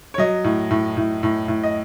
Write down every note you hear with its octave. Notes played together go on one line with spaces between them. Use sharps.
C#5
F#3 D#5
A2
A2
A2
A2
A2
D#5